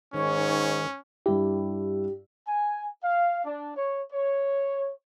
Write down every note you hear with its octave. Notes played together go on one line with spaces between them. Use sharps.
G#2 D#3 C#4 C#5
G2 E4 G4
G#5
F5
D4
C#5
C#5